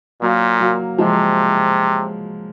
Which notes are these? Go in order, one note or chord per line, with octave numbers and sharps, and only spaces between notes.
A#2 F#3 A#3
F#3 A#3
C3 F3 G#3